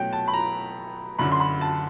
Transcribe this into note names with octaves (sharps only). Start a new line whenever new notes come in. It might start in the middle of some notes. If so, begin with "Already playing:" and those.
Already playing: B2 F#3 A3 C#4 G5
A5
B5
A#5
F#2 D3 F#3 B5
C6
B5
A5